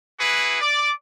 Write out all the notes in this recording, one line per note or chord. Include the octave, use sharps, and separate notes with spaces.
E4 F#4 G#4 B4
D5 D6